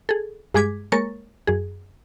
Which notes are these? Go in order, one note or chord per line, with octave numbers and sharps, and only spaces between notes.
G#4 A4
G2 G#3 G#4 D6 G#6 B6
G#3 A#3 A#4 C#5 C#6 A6
F#2 G#4